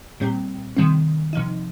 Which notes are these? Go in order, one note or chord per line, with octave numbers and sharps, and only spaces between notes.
A#2 G3 C4 G4
C3 D#3 G3 C4
C3 F3 D#4